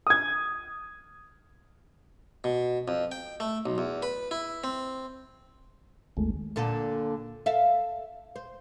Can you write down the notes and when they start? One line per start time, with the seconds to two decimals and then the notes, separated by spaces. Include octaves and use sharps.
0.07 D#6 G#6
2.44 B2
2.88 F2
3.12 G5
3.40 A3
3.66 B1
3.78 E2
4.03 B4
4.31 E4
4.64 C4
6.17 G#1 D#2 G#3 A3
6.56 A#2 D3 A4
7.46 A4 E5 F5
8.36 C5